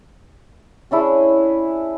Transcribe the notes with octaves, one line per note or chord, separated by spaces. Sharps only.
C#4 D4 E4 G#4